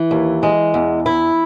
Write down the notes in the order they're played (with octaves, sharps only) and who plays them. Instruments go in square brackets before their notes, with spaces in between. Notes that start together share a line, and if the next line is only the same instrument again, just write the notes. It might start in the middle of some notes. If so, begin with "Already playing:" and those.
Already playing: [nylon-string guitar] E3
[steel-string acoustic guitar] D#2
G#3
E2
E4